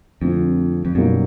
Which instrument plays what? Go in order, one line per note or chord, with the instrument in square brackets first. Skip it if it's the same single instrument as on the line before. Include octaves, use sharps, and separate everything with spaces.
[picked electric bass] F2 [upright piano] D3 F3 A3 C4
[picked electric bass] F2
[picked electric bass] F#2 [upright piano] B2 G3 A#3 D#4